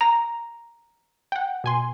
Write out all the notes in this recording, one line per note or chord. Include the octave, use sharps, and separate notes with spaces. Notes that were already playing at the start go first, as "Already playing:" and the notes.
A#5 A#6
F#5 G5
B2 G#5 C6